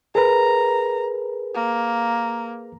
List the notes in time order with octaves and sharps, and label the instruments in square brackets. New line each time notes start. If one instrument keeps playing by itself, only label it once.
[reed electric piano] G#4 A#4 B4 [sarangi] A#5
[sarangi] A#3